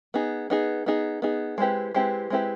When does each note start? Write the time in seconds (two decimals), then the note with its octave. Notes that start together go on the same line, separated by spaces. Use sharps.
0.14 B3 D#4 G#4
0.50 B3 D#4 G#4
0.86 B3 D#4 G#4
1.22 B3 D#4 G#4
1.58 G#3 C4 E4 G4 B4
1.94 G#3 C4 E4 G4 B4
2.30 G#3 C4 E4 G4 B4